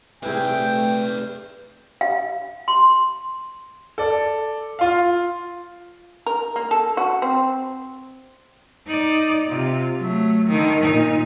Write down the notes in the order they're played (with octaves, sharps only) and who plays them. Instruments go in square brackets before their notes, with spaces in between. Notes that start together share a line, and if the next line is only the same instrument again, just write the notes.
[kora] C3 E4 G#4 [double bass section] A3 [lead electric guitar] B4 D5 [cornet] G5
[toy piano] F5
C6
[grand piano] A4 D5
F4 F5
[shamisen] A#4
A#3
A4
F#4
C4
[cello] D#4 D5
C3 F4
F#3 A3
D3 D#3
A#2 D#4